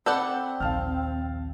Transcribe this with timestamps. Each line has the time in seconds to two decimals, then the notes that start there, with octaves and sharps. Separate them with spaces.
0.06 C4 A4 D5 F#5 B5 G6
0.60 A#1 D#2 F5 A5 F6